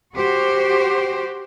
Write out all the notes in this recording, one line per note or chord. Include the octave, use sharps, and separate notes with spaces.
F#4 G4 C5